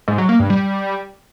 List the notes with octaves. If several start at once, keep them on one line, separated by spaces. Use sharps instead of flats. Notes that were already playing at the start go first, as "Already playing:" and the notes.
G#2
F#3
A#3
G2
G3